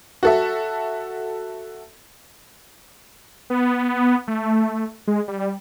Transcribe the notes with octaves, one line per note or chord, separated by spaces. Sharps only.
F#4 A4 E5
B3
A3
G#3
G3